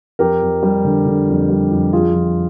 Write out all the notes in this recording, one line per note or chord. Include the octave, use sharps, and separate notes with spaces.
F2 G4 A#4
F2
G3
D3
D3
F2
G3
F2
F3 F4 G#4
F3